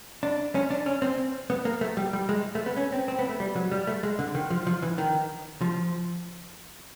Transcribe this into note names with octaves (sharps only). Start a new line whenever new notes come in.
D4
C#4
D4
C#4
C4
B3
A#3
A3
G3
G3
G#3
A3
B3
C#4
C4
C4
B3
A3
G3
F#3
G3
A3
G#3
D3
D#3
F3
F3
E3
D#3
F3